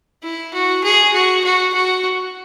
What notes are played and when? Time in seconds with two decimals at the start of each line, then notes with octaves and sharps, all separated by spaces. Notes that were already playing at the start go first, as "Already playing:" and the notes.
0.23 E4
0.54 F#4
0.84 G#4
1.13 F#4
1.44 F#4
1.74 F#4